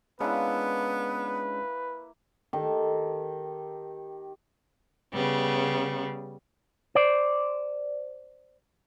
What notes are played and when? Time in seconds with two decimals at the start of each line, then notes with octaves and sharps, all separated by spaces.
0.20 G#3 A#3 B3 C#4 D4 E4 B4
2.53 D#3 G4 A4
5.13 C#3 G3 B3
6.95 C5 D5